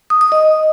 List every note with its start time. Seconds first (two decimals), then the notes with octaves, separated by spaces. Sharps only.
0.10 D#6
0.21 D#6
0.32 D#5